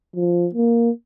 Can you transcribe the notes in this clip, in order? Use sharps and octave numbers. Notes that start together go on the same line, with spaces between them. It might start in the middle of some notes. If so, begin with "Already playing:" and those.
F3
A#3